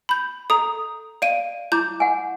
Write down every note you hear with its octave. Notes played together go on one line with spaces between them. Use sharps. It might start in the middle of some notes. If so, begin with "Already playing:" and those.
B5 G6
A4 A#5 D#6
D5 F5 D7 D#7
E4 A#5 D6 G6
F#5 G#5